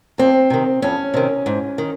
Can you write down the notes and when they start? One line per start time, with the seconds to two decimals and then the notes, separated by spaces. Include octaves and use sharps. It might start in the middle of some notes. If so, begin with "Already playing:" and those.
0.18 F2 C4
0.50 C3 D#3
0.82 F2 C#4
1.14 C3 D#3
1.46 G#2
1.78 D#3